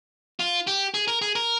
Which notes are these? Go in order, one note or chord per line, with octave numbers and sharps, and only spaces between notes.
F4
G4
G#4
A#4
G#4
A#4